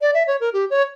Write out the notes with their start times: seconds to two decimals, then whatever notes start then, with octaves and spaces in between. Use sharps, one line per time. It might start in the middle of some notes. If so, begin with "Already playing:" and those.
0.01 D5
0.14 E5
0.27 C#5
0.40 A#4
0.53 G4
0.70 C#5